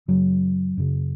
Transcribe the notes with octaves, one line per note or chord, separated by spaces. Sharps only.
F#2 C#3 F#3
F#2 C#3